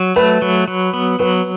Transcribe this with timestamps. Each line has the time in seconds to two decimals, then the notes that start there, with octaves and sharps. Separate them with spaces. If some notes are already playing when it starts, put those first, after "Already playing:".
Already playing: F#3
0.16 A3 B4
0.42 F#3
0.68 F#3
0.93 B3
1.19 F#3 B4